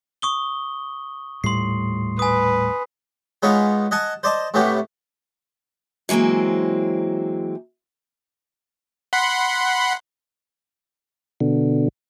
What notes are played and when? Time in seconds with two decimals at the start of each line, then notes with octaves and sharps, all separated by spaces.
0.22 C#6 D#6 G7
1.44 D#1 A2 G3 C6 C7
2.19 B4 G#5 D#6
3.43 G#3 B3 C#4 D#4 F4 C#5
3.91 D#5 F#5 G#5 A5
4.23 C5 D5 D#5 A5
4.54 A2 C3 A3 B3 C#4 G4
6.09 E3 F#3 G#3 A#3 C4
9.13 F#5 B5 C6
11.40 B2 D3